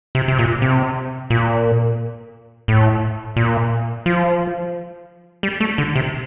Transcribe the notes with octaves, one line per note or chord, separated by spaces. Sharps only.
C3
C3
A#2
C3
A#2
A2
A#2
F3
G3
A3
D3
C3